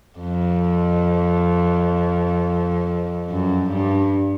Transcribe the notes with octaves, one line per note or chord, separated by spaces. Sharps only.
F2
F#2
G2